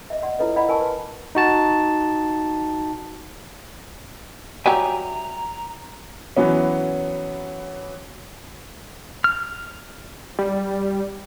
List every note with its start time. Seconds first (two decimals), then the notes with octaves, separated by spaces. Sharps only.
0.10 D#5 E5
0.22 D5 D#5 F#5 C6
0.39 E4 F4 A4 B4 C#5 D#5
0.56 D5 D#5 F5 F#5 A#5 B5
0.69 A#4 G#5 A5 C#6
0.81 B4 C6
1.35 D#4 F#4 A5
4.66 F#3 G3 G4 E5 G5 G#5 A#5
6.37 E3 F#3 B3 C#4
9.24 F6
10.39 G3